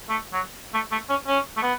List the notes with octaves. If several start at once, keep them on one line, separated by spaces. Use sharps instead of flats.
A3
F#3
A3
A3
C#4
C#4
A3
B3